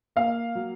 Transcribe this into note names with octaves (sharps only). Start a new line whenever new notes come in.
A#3 F5
F#3